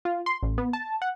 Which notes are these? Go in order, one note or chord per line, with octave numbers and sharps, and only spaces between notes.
F4
C6
A1
B3
A5
F#5